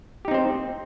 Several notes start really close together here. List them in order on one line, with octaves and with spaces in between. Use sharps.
G4 D#4 C4 C5